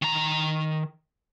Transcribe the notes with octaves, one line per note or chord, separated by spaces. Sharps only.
D#3 A#5